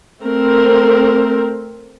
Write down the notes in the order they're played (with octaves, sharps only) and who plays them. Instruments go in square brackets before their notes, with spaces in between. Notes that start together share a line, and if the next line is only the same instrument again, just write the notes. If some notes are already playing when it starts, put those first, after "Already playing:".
[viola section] A3 C4 A#4